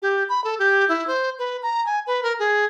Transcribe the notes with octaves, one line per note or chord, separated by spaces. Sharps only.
G4
B5
A4
G4
E4
C5
B4
A#5
G#5
B4
A#4
G#4